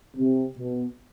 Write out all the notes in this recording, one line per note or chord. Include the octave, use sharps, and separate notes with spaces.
C3
B2